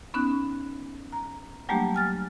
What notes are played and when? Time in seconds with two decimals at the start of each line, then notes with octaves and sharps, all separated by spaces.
0.14 B3 C#4 D#4 F#6
1.12 A#5
1.69 F#3 G3 A3 A#3 D4 G4
1.94 G#5 F6 A6